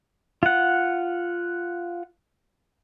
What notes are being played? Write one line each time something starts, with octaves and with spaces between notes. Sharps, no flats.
F4 F#5